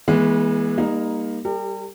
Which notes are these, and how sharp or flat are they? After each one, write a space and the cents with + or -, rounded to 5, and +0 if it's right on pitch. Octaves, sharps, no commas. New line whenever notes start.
E3 -5 G#3 +0 B3 -40
G3 +35 A#3 +10 D#4 +0
G3 +0 G4 +25 A#4 -40